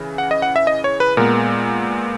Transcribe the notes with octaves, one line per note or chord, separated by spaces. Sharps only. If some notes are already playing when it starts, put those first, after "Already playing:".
Already playing: C#3 E3
F#5
D#5
F#5
E5
D#5
C#5
B4
A#2 G#3 B3 A#4